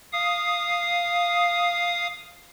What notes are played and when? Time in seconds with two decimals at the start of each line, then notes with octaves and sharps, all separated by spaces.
0.13 F5 D#6